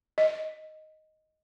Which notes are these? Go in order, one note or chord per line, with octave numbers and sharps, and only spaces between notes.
D#5